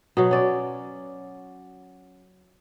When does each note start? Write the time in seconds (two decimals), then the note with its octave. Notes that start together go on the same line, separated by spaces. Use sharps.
0.17 B2 F#3
0.31 C#4 D5